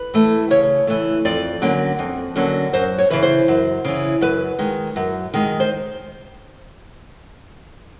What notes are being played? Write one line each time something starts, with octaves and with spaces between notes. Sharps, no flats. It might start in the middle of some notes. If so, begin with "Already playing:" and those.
Already playing: B4
E3 A3
C#3 C#5
E3 A3
F2 D5
D3 F#3 A#3 C#4
F2
D3 F#3 A#3 C#4
F#2 C5
C#5
C#3 E3 B4
C5
F#2
C#3 E3
F#2 B4
D#3 G#3
F#2
D#3 G#3
C5